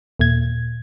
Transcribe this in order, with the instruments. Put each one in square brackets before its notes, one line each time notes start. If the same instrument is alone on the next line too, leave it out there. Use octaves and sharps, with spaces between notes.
[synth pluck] D#2 A#2 G#6